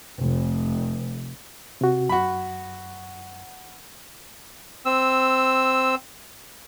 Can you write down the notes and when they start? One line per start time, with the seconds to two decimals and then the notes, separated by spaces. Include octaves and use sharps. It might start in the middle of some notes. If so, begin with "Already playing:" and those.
0.21 F1
1.81 C3 F#4
2.09 F#2 F#4 B5
4.86 C4 E6